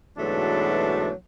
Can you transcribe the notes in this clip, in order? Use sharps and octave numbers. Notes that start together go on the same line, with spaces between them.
G#2 B2 E3 F#3 A3 D4